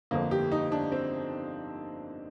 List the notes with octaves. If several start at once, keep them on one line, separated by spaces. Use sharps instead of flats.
G1 F2 D3 F3 A#3
G4
D#4
D4
C4